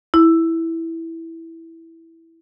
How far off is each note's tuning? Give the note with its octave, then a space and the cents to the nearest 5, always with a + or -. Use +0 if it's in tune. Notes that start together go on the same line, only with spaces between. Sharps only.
E4 -5